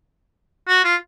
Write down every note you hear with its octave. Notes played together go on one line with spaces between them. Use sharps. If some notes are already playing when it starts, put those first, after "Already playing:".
F#4
F4